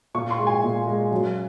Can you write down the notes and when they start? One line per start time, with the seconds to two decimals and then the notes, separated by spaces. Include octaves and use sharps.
0.14 A#2 C#6
0.31 C6
0.39 G#3
0.47 G#5
0.64 A#2
0.87 G#3
1.12 F#2